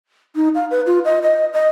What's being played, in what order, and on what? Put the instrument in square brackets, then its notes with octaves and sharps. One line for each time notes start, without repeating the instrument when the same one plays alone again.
[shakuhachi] D#4
F5
B4
F4
D#5
D#5
D#5